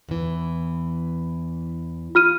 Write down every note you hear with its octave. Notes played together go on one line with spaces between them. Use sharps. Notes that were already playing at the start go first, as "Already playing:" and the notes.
E2 E3
F4 F6 D#7